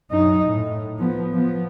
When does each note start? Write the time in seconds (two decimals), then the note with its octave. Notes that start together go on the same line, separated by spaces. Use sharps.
0.11 F#2 D#4
0.45 A2
0.99 F3 B3
1.33 F3 B3